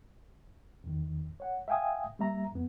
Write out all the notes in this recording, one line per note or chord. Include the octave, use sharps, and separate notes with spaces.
E2 D#3
C#5 F#5
E5 F5 G5 G#5 D#6
G3 A#3 E5 A#5
F2 B3